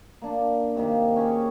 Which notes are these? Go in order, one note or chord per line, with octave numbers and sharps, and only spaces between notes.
A#3 D4
C3 D#3 A#3 G4
C#4 G4 G#4 C#5